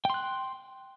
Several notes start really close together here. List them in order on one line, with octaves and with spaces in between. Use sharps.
G5 C6 F#6